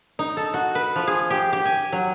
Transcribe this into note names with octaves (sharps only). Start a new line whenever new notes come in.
D#4
A4
F#4
B4
F3
G#4
G4
G4
G#5
F#3